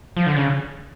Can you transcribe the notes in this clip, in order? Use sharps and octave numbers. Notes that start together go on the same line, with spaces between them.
F3
D3
C#3